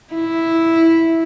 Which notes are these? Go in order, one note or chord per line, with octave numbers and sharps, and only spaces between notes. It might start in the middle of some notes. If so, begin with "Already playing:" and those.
E4